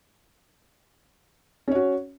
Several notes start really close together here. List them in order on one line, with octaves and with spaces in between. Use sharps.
C#4 C#5 F#4